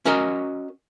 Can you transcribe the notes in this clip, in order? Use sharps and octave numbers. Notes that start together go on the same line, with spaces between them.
C#4 F#4 A#4 C#5 D#5